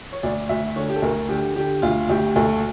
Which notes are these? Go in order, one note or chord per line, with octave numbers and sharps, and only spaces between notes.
C#5
D2 D5
D2 E5
D3 C#5
G4
A4
D2 A#4
D3 G4
D3 G4
D2 F4
D2 G4
D2 A4